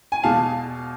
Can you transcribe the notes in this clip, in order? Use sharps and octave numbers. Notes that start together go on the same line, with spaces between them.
G#5
E2 B2 G#3 F5 A5